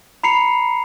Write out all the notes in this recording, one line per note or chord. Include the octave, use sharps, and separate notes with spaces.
A#5 B5 C7 C#7 F7